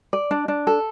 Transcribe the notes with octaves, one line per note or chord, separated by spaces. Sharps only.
D5
D4
D4
A4